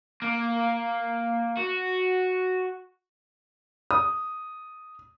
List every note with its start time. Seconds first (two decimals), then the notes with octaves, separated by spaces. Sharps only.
0.22 A#3
1.57 F#4
3.91 D#6